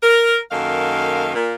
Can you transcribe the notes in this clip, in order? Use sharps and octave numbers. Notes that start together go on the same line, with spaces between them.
A#4
F#2 D#3 A#3 A4 F5
A#2